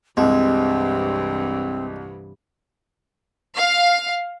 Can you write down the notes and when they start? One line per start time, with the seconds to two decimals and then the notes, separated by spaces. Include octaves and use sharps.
0.17 C2 G2 C3 E3 G#3 C4
3.55 F5